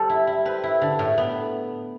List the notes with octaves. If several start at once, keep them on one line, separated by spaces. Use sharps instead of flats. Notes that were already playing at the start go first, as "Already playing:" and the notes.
Already playing: G3 C4 A4
E4
E4
C4 B4
E4
D3
A2
B3